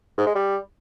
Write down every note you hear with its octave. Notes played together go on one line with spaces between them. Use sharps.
G#2
G#3
G3